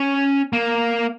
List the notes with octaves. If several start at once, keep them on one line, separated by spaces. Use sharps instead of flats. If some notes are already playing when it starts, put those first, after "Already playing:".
Already playing: C#4
A#3